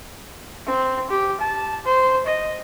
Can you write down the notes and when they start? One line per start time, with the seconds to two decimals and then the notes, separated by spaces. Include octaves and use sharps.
0.67 C4
1.10 G4
1.40 A5
1.85 C5
2.26 D#5